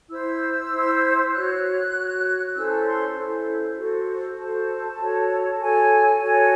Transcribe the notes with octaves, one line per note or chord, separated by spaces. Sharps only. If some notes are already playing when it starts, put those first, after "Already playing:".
E4 C5 E6
E4 C5
F#4 C#5 F#6
F#4
C#5
C#4 E4 A4 C5 E6
A5
C6
C#4 E4 A4 C5
F#4 A4 C5
F#4 A4 C5 A5
F#4 A4 C#5
F#4 A4 C#5 G#5
F#4 A4 C#5 G#5